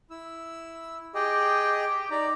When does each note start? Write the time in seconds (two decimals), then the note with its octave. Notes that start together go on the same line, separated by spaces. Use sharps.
0.10 E4 E6
1.15 G4 G#4 D#5 G5
2.11 D#4 D5 A#5